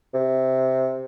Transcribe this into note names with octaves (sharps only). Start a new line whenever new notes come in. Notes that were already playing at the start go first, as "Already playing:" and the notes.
C3